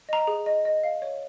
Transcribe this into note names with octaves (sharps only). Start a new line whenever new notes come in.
D#5 A#5
G#4
D#5
D#5
F5
C#5